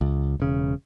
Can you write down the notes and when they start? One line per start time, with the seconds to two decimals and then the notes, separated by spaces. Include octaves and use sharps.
0.01 C#2
0.40 E1 C#3